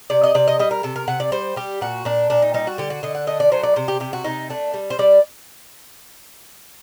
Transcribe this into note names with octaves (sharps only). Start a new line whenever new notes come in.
C3 D5
D#5
C3 D5
D#5
G3 D#5
A#4
C3 A4
A#4
C3 F#5
D5
G3 C5
G3 G4
A#2 F#4
A#2 D4
A#2 D4
D#4
G3 D#4
F#4
D3 G4
F#4
D3 D#5
F#5
A3 D#5
D5
F#3 C5
D5
C3 C5
G4
C3 G4
F#4
C3 D#4
A3 D4
G3
C5
G3 D5